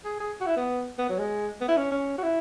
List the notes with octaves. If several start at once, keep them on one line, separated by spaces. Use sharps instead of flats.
G#4
G#4
F#4
E4
B3
B3
F#3
G#3
B3
E4
C#4
C#4
F#4
E4